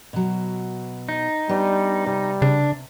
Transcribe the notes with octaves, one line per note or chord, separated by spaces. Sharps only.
B2 F#3
D#4
G3 B3 D4
C3 G3
C#3 D4